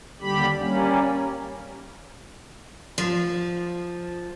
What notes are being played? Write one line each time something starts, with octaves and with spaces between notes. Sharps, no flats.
D#2 D3 G3 G4 B5
G3 A#3 C#4
F3